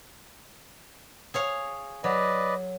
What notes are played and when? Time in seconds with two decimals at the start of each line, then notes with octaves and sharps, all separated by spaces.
1.34 G#4 C#5 F5
2.04 F#3 B4 D5 D#5